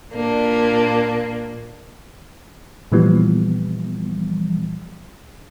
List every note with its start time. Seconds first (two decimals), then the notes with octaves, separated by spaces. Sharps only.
0.14 A#2 A#3 D4
2.92 A#2 E3 F3 G3 B3